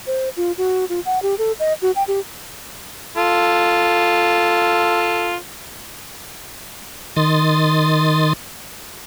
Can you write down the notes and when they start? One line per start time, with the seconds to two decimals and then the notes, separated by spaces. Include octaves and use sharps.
0.07 C5
0.37 F4
0.58 F#4
0.89 F4
1.06 F#5
1.22 G4
1.38 A4
1.60 D#5
1.82 F#4
1.96 G5
2.08 G4
3.17 F4 A4
7.16 D#3 C6 D#6 A6